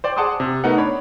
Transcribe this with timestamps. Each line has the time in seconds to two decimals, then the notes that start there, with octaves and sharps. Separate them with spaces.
0.04 C5 D5 G5
0.17 G#4 F#5 A5 C6 D6 D#6
0.40 C3
0.64 A3 B3 D#4 A#4 F#5
0.77 D4 C#5 B5